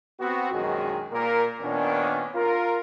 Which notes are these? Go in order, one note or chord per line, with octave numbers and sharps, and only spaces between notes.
B3 C4 F#4
A#1 F#2 D#3 G#3 F#4 G#4
A#2 A#4
A#2 D#3 B3 C#4 D4
F4 A#4